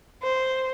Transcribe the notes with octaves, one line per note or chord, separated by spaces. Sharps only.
C5